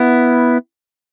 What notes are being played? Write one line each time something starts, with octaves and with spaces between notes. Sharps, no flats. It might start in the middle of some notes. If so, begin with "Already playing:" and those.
Already playing: B3 E4